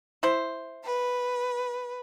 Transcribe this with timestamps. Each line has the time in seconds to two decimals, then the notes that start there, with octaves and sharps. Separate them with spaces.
0.23 E4 C5
0.84 B4